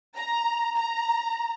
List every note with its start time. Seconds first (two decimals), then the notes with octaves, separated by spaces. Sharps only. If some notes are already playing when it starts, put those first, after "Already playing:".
0.17 A#5
0.76 A#5